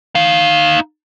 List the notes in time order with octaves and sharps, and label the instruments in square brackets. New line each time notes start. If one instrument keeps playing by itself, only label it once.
[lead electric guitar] D#4 F5